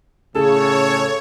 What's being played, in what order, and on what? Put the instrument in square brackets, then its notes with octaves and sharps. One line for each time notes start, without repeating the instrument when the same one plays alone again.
[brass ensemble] A2 C#3 [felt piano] G#4 [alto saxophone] A4 [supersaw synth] C#5